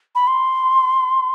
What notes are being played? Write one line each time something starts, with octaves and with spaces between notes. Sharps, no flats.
B5
C6